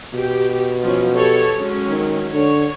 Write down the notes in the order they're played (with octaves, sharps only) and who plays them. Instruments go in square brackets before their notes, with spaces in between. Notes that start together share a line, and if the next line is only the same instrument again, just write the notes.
[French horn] B2 [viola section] G4
[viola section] F3 F#3 C#4
G4 A4 C#5
F#3 G#3 C#4
[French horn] D#3
[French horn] D3 [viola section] C#5